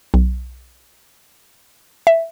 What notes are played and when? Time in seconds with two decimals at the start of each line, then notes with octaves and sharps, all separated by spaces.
0.14 B1
2.07 E5